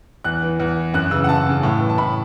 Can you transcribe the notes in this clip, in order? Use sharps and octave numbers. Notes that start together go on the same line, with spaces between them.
E2 F#6
E3
E2
E3
F#2 F#6
C#3 E3 E6
F#5
F#2 A5
C#3 E3
A2
E3
A5
A2 B5